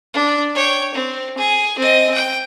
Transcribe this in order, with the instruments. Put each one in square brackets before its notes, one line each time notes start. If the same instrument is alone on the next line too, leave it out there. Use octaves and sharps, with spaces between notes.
[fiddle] D4
C#5 G5
C4
G#4
C4 D#5
G5